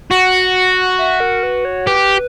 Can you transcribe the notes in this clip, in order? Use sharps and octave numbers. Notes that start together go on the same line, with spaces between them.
F#4 F#5
E5
A#4
B4
C#5
G4 B4